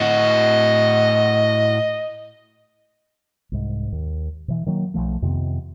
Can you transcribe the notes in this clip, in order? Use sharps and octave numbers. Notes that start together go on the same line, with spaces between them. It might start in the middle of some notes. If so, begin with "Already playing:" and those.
A2 F#4 D#5
C2 G#2
D#2
B2 E3
D#3 F#3 A3 A#3
B1 E2 F3 A3
F2 C3 D#3 B3